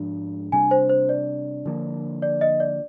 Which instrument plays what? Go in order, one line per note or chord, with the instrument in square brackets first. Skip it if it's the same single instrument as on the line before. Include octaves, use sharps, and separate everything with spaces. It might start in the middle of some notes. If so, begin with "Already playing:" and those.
Already playing: [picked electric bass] G#2 F3 G#3 D4
[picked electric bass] C3 G3 D4 [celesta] G#5
[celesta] C5
C5
D5
[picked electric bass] D3 F3 A#3
[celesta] D5
D#5
D5